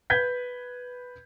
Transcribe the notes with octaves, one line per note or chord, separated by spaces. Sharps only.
B4 G6 G#6 B6